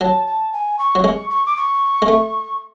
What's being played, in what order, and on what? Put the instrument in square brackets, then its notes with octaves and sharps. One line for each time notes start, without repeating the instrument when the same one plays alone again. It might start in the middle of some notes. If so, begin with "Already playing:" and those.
[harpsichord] F#3 [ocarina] A5
[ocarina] A5
G#5
C#6
[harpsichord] F#3
[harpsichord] G#3 [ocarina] C#6
[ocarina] C#6
D6
C#6
[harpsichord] G#3
A3